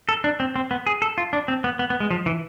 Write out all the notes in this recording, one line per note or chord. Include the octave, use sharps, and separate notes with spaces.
A4
D4
C4
C4
B3
G#4
A4
F4
D4
C4
B3
B3
B3
G#3
F3
E3